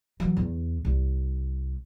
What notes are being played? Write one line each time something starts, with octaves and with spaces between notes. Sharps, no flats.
E3 F#3
E2
C2